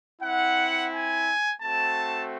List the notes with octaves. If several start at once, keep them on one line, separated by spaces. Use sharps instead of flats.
C4 E4 F#5
G#5
A3 C4 F#4 A5